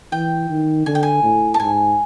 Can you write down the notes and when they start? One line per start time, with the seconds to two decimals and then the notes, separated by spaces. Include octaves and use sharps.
0.12 E3 G5
0.50 D#3
0.86 D3 G#5
0.95 G5
1.03 G#5
1.23 A2
1.54 A5
1.60 G#2 G#5